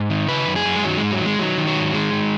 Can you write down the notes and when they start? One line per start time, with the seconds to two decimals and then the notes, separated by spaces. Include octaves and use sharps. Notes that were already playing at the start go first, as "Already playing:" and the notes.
Already playing: G#2
0.10 D#3
0.28 C#3 B4
0.47 F#2
0.56 G#4
0.65 F#2
0.76 G#3
0.83 D#3 F#3
0.97 G#3
1.03 G#2
1.11 F#3
1.21 D#3 G#3
1.39 D#3 F#3
1.58 D#3
1.67 F#3
1.76 G#2
1.94 D#3 G#3
2.13 D#3